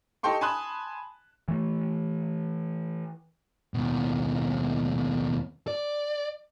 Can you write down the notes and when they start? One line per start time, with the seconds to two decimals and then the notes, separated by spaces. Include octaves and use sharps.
0.23 D#4 G4 A4 G5 C6 C#6
0.41 G#5 A5 B5 C6 D#6 F#6
1.48 E3 A3
3.74 D#2 B2
5.68 D5